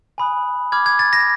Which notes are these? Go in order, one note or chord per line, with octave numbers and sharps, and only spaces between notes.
G#5 B5 D#6 F#6
B5 D6 F6 G#6
G#6
A6
A#6